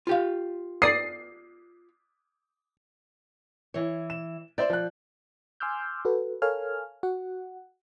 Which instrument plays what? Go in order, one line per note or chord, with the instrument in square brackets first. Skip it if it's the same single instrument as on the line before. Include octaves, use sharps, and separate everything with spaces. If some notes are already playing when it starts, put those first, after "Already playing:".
[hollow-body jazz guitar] F4 G4 F5
[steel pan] D5 D#6 [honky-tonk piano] C7
[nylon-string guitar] E3 C#5
[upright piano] E7
[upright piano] C5 E5 G6 [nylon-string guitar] D5
[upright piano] F3 F#6
[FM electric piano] G#5 C6 D6 E6 F6 G6
F#4 A4 B4
A4 A#4 C#5 F5 G#5 F6
F#4 F#5